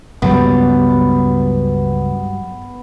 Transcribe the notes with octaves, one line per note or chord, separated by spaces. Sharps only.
C#2 G2 F#3 G3 B3